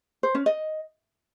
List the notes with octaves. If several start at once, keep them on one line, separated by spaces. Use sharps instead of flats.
C5
C#4
D#5